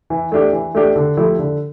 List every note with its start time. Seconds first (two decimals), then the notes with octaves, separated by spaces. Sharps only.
0.10 E3
0.32 A3 D4 G4
0.53 E3
0.75 A3 D4 G4
0.96 D3
1.17 F3 A3 E4 G4
1.39 D3